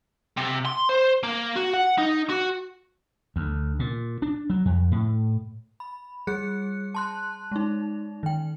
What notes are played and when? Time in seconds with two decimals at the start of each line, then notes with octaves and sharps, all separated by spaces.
0.37 C3
0.66 C6
0.89 C5
1.23 A#3
1.56 F#4
1.74 F#5
1.98 D#4
2.30 F#4
3.36 D2
3.79 A#2
4.22 D4
4.50 F#3
4.65 F2
4.91 A2
5.80 B5
6.27 G3 G#4 F#6 C#7
6.95 A5 C6 F#6
7.52 G#3 D#4
8.23 D#3 G5